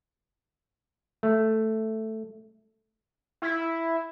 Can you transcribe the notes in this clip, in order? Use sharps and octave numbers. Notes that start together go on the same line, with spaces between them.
A3
E4